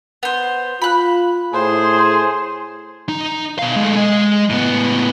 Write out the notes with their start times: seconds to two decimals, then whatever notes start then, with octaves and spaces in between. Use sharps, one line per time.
0.23 B3 C5
0.82 F4 B5 F#6
1.53 A2 G#4 C5
3.09 D#4
3.59 B2 F5
3.76 G#3 A3
3.96 G#3 D#5
4.50 A2 B3